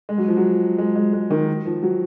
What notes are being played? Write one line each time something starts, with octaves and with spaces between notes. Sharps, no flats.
G#3
F#3
F3
F#3
G#3
G#3
G#3
D#3
F3
F#3